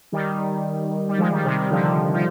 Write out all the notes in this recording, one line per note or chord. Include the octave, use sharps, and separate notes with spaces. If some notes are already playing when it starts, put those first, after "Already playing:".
D#3 G3
G3
F3 G#3
D#3 G3
C3 D#3
C3 D#3
D3 F3
F3